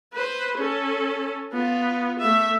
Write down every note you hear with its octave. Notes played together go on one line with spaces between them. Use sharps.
B4 C5
C#4 A4
B3 F4
A3 E5